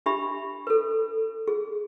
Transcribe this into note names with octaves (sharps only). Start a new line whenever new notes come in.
D4 G4 E5 B5
A4 B4
G#4